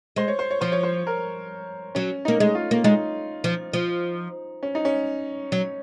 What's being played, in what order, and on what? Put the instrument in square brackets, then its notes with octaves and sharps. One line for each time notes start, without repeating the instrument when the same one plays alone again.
[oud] G#3 [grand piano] C5
[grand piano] C#5
C5
C#5
[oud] F3 [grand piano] C5
[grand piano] C#5
C5
A#4
[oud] F#3 [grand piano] C#4
[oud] A#3 [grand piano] D#4
[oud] G#3
[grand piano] F4
[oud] A#3
[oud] G#3 [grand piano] D#4
[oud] F3
F3
[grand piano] C#4
D#4
C#4
[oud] F#3